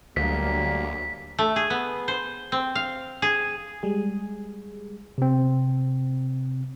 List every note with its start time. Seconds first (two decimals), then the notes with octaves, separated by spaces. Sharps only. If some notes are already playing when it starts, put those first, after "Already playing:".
0.16 D2 F#3 G3 A#3 B6
1.39 A3
1.56 G#4
1.70 B3
2.08 C5
2.52 C4
2.75 F5
3.22 G#4
3.83 G3 G#3 G#4
5.18 C3 C4